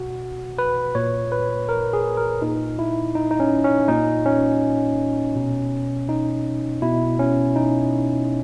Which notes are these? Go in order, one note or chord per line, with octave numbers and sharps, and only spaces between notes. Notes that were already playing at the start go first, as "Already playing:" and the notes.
Already playing: B2 F#4
B4
A#2 C#5
B4
A#4
G#4
A#4
A#2 D#4
E4
D#4
D#4
C#4
C#4
A#2 D#4
C#4
B2
D#4
B2 E4
C#4
D#4